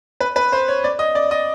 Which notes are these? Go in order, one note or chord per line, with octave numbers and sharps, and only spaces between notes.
B4
B4
C5
C#5
D5
D#5
D5
D#5